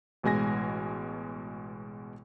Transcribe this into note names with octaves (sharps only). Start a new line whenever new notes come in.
A1 B2 G#3 G#5 A#6